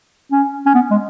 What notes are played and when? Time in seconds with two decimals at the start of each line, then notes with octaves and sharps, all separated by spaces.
0.32 C#4
0.66 C#4
0.75 B3
0.91 G#3